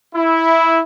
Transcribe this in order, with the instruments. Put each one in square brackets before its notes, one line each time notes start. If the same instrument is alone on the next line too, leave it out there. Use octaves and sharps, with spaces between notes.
[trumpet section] E4